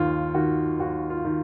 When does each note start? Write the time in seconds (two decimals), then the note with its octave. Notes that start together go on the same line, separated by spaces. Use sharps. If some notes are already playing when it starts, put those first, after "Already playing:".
Already playing: D#2 D#3 F4
0.34 D#3 F#4
0.79 D#2 F#4
1.10 F4
1.25 D#3